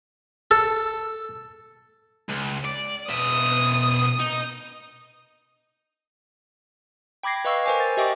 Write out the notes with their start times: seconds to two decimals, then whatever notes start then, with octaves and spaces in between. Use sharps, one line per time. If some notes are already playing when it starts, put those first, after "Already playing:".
0.51 A4
2.29 C#2
2.65 D5
3.09 B2 E5 D#6
4.20 D#4
7.23 G5 B5 D6 G#6 A#6 C7
7.45 B4 D#5 F5 C#6 E6
7.66 A#4 C5 G#5
7.80 A6
7.97 G4 D#5 E5 G5 C#6 D6